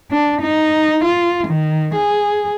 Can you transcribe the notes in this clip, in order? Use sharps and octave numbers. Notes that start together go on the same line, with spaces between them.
D4
D#4
F4
D#3
G#4